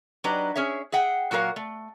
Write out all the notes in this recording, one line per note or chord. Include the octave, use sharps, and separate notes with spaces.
F#3 D4 D#4 G4 B4 A#5
C#4 G#4 C#5 E5
G#4 E5 F#5 G5
A#2 F#3 F#4 A#4 F5
A3